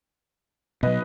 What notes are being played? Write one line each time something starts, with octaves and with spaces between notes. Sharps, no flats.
B2 F#3 B4 D#5